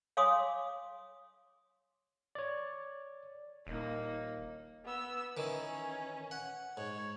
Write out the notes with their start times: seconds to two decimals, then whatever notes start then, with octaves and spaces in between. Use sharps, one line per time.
0.17 C#5 F5 G#5 C6 D6 D#6
2.35 C#5 D5
3.67 D#1 A#3 D#4
4.85 B3 E6
5.37 D#3 E3 C#4
6.31 F#5
6.77 G#2 C#5